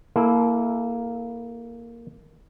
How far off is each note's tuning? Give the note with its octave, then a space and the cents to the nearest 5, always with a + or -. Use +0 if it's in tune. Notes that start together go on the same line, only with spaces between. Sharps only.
A#3 +0 E4 +0 A4 -30